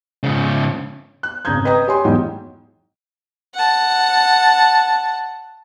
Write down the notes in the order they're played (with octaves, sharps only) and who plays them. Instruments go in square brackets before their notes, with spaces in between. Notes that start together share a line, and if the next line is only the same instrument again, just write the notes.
[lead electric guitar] G#2 C#3
[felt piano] F#6
G#1 C#3 A#5 D#6 G6 G#6
B4 D#5 G5 A#5 D#6
G4 C#5 G#5 B5 C6
E2 G#2 E3 F#3 G5
[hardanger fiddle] F#5 A5